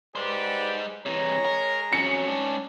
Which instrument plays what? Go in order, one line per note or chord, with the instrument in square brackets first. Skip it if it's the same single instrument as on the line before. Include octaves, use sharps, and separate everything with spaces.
[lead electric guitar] G#3 C5 [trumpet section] G4 B4 D5
[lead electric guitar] C3 E3 [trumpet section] G#3 A#5 [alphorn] C#5
[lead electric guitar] A#4
[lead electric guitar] F2 F#3 [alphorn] C#4 [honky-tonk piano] C#7
[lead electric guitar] G#2 D4